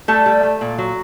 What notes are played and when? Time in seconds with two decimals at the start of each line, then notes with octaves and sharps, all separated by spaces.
0.08 G3 A3 A4
0.26 G3
0.43 A3
0.61 A#2
0.78 F#3